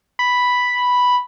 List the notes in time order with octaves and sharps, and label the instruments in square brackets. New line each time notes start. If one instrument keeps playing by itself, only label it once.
[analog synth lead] B5